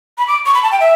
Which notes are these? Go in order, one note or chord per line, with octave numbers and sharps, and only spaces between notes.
B5
D6
C#6
B5
A5
G5
E5